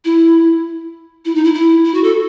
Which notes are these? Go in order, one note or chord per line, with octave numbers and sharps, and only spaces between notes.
E4
E4
D#4
E4
E4
E4
F#4
A4